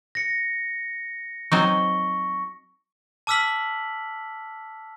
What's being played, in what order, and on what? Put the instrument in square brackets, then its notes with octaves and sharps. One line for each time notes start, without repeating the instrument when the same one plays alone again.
[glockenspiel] A#6 C#7
[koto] F#3 C4 D#4 [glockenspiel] C#6
[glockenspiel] A5 D6 E6 F6 B6 F#7